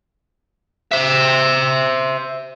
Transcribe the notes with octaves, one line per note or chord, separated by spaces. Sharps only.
C5 E5